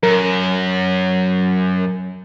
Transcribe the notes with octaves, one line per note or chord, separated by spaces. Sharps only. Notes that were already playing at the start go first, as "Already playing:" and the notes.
F#2 A#4